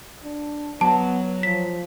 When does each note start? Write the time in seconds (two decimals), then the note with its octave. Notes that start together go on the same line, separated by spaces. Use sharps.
0.24 D4
0.81 F#3 B3 A5
1.43 F3 B6